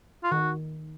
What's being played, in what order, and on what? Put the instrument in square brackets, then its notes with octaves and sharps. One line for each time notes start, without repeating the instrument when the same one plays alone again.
[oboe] F4
[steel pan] D#3 [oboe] F#4